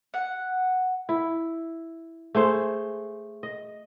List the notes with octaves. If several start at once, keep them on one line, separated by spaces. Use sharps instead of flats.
F#5
E4
A3 G#4 C5
D#5